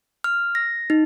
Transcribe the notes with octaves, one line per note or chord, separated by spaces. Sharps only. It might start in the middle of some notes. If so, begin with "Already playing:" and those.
F6
A#6
D#4